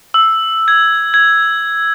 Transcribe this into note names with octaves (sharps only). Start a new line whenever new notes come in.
E6
G#6
G#6